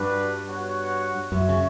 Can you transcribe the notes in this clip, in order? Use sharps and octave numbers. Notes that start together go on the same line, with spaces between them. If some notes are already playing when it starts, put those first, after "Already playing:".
Already playing: G2 G3 D4 F#4 B4
B3 F#4 C#5 F#5
F#2 F#4 C#5 E5
C#3